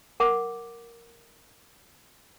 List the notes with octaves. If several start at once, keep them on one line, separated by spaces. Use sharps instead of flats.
A#4 F#5 D6